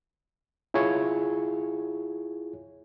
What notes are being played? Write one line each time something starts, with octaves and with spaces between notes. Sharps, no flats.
E4 F4 G#4 C#5